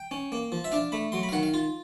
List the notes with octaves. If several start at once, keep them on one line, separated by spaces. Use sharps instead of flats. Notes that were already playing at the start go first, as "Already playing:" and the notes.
Already playing: G5
C#4
A#3
F3
E5
D4 F5
A3 B5
F#3 C6
B5
F5
D#3 F#5
F5
F4